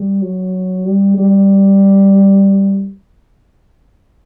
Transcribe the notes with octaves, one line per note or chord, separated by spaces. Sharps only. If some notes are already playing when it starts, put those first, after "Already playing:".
Already playing: G3
F#3
G3
G3